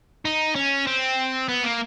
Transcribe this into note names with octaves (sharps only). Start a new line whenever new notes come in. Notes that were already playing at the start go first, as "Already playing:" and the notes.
D#4
C#4
C4
B3
A#3